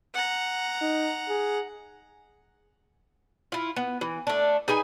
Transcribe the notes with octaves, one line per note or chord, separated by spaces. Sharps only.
F#5 A#5
D#4
G#4
E4 F4
B3
E3
A3 D4
D#4 G#4 B4 G#5